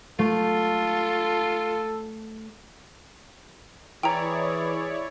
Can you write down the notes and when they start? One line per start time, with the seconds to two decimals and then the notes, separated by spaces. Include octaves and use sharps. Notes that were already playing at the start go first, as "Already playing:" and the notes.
0.19 A3 F4 A4
4.03 E3 E4 G#4 C#5 D5 G5 A#5